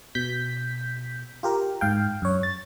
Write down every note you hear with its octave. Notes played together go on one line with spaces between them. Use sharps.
B2 G6 B6
F4 G4 A#4
G#2 F5 G5
F#2 C#5
A6